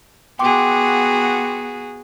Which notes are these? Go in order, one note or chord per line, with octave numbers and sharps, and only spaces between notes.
B3 F#4 G#4 G5 C6 D6